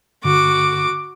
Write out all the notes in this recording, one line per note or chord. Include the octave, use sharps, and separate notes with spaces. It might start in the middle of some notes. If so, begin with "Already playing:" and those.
G2 D3 F#4 D6